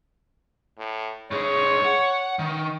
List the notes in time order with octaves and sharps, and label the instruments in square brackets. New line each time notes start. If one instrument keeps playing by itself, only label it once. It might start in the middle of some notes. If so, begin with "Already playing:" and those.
[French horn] A2
[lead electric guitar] A2 G#4 [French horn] C#5
[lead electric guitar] F#5
D#3